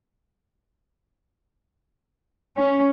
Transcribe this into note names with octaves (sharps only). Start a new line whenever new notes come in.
C#4